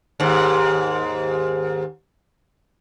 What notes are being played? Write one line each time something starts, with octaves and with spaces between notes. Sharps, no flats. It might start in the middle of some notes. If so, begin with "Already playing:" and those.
D#2 G#2